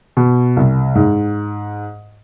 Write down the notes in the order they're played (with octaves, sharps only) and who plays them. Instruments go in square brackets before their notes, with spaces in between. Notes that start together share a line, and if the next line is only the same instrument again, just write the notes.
[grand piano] B2
C2
G#2